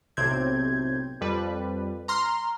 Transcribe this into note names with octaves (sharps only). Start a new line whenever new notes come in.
B1 A2 C3 C4 G6 G#6
F2 G3 B4
A#5 C6 F6